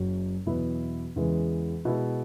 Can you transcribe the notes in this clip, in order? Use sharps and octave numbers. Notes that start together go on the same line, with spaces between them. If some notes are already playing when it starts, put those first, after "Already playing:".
Already playing: F#1 F#2 F#3 C#4
E2 B2 F#3 B3 E4
E2 C#3 E3 G#3
B2 G#3 E4